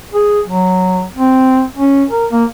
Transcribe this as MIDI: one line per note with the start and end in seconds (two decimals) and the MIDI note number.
0.12 0.40 68
0.47 1.03 54
1.16 1.63 60
1.76 2.04 61
2.10 2.26 70
2.31 2.44 58